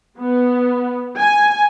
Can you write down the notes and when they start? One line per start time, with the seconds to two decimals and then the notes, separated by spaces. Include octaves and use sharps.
0.19 B3
1.19 G#5